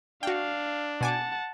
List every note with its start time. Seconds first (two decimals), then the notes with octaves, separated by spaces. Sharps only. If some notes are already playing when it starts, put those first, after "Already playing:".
0.23 D4 F#4 F5 G5
1.01 B2 F#5 G#5 A5 D6